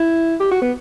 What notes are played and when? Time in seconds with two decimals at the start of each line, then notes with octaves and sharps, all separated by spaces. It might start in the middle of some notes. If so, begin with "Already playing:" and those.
Already playing: E4
0.40 G4
0.51 F#4
0.62 B3